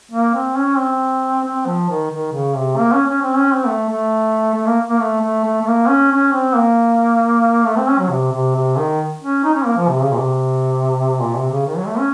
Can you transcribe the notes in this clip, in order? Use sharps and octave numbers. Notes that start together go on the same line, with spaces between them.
A#3
C4
C#4
C4
C4
F3
D#3
D#3
C#3
C3
A#3
C#4
C#4
C4
C#4
C4
A3
A3
A3
A#3
A#3
A3
A3
A3
A3
A#3
C#4
C#4
C4
A#3
A3
C4
C#4
F#3
C3
C3
C3
D#3
C#4
D#4
C#4
A#3
F3
C3
C#3
A#2
C3
A#2
C3
C#3
D#3
F#3
A3
C#4